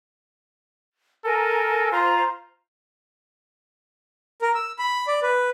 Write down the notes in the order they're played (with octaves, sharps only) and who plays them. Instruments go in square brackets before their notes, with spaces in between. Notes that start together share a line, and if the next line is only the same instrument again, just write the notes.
[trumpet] A4 [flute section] A#4 G#5
[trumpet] F4 [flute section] C5 A#5
[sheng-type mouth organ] A#4
E6
B5
D5
B4